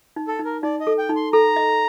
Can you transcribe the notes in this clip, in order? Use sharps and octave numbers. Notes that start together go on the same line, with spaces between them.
D#4
A4
D#4
A#4
D#4 D5
D#5
A4
G5
D#4
C6
A4 A#5
D#5